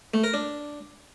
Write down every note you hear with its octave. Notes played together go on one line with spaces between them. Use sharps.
A3
A#4
D4